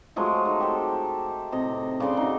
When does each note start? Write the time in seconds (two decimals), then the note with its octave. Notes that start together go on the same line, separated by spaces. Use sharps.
0.16 F3 F#3 G#3 A3
0.45 D#4
0.60 G4 A4 C5
1.52 A2 C3 D#5
2.00 C#3 D4 D5 C6
2.17 D#4 F#4